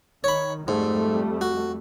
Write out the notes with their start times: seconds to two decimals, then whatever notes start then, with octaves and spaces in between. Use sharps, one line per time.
0.24 D#3 C#5 B5
0.68 F2 G#2 G3 A3
1.41 F#4